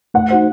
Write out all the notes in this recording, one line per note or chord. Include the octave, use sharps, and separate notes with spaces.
A3 F#5
D#4 F#4 C5